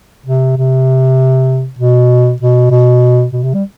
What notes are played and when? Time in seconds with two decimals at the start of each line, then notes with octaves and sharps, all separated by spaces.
0.26 C3
0.57 C3
1.79 B2
2.41 B2
2.71 B2
3.33 B2
3.43 C3
3.54 G3